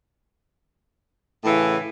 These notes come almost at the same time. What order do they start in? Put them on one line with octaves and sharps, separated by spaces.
A2 E3 C#3